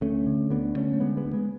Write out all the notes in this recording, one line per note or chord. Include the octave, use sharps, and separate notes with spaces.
D2 A3 C#4
D3
D2 B3 D4
D3 A3 C#4
A3
D3 G#3 B3
G#3 B3
D2
G#3 B3